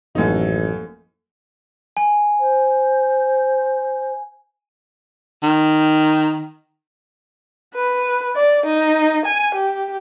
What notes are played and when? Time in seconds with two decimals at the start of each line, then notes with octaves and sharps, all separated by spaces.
0.15 A1 F#2 F3 A#3 D#4 A4
1.97 G#5
2.40 C5
5.43 D#3
7.74 B4
8.36 D5
8.66 D#4
9.25 G#5
9.54 G4